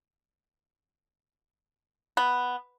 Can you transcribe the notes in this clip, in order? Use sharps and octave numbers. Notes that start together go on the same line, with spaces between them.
B3